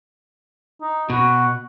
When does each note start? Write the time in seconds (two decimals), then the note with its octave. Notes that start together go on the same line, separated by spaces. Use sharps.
0.81 D#4
1.10 B2 F#4